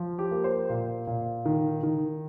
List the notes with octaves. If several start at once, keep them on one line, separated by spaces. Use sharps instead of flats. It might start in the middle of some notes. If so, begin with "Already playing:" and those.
Already playing: F3
G4
A#3
C5
A#2
A#2
D#3
D#3